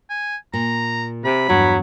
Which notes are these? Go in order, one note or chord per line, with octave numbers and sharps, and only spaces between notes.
G#5
A#2 A#5
C3 B5
E2 G2 F#3